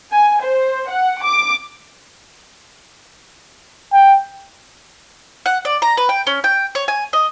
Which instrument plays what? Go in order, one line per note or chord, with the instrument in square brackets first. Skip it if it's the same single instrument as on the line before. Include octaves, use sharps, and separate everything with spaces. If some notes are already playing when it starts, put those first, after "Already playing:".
[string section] G#5
C5
F#5
D6
[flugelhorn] G5
[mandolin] F#5
D5
A#5
B4
G5
C#4
G5
C#5
G#5
D#5